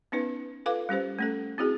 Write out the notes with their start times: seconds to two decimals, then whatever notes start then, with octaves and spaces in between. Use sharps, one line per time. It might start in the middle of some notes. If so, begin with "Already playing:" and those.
0.12 B3 C#4 D#4 B4
0.66 F4 A4 B4 F5 D6
0.89 G3 C#4 G4 C5
1.19 A3 C#4 A4
1.58 C4 E4 F#4 G#4